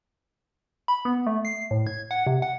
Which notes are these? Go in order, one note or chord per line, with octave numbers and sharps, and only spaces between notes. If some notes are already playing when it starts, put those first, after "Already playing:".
B5
B3
A3
C7
A2
G#6
F#5
C3
F#5